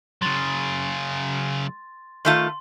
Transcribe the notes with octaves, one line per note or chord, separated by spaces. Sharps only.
C#3 F#3 C6 A6
D#3 A3 F4 C6